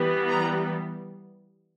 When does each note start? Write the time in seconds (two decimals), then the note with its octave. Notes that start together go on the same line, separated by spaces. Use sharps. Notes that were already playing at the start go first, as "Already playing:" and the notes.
Already playing: E3 G3 B3
0.29 A#5